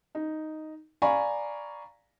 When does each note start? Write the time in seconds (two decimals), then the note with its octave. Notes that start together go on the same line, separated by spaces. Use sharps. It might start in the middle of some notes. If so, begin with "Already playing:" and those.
0.15 D#4
1.02 D5 F5 G#5 A#5 B5 C#6